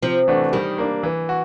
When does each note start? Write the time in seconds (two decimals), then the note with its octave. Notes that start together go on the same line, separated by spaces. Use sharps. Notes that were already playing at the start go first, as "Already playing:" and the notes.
0.03 C3 F3
0.28 E3 A3 D4 F#4
0.53 D#3 G3
0.78 A#3 D4
1.03 E3
1.29 F#4